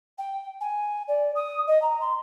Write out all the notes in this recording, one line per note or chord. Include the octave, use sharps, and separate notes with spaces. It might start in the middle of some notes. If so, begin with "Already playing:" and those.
G5
G#5
D5
D#6
D#5
A#5
C6